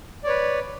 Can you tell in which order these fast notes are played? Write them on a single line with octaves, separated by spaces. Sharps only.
D5 C#5 B4